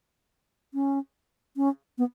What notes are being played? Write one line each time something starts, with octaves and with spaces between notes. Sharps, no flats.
C#4
C#4
B3